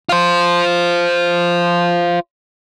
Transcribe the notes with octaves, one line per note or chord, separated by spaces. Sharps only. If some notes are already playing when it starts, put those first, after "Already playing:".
F4 C5